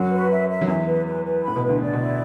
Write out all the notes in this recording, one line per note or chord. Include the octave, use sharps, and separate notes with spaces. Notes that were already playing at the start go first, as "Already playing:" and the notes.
Already playing: F#2 F#3 F#4
B4
E5
E5
F#3
E2 E3 E5
B4
B4
B4
A2 B5
B2
B4
D2 D3
A2 D5
B2
E4